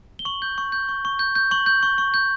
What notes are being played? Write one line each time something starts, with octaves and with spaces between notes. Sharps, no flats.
G7
C#6 F#7
G6
C#6
G6
C#6
C#6
G6
G6
C#6 F#7
G6
C#6
C#6
G6